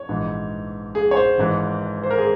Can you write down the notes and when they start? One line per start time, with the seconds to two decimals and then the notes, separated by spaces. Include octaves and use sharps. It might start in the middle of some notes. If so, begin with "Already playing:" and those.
Already playing: C#5
0.09 A#1 G#2 E3
0.95 G#4
1.11 C#5
1.17 C5
1.38 G#1 G#2 E3
2.03 C5
2.11 A#4
2.18 G#4